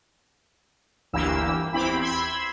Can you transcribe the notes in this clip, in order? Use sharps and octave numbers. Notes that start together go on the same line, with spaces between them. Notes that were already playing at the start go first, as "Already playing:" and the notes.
G1 D2 E3 A#3 G4 E6
E2 C4 E4 G4 B5
B5 C6 E6 G#6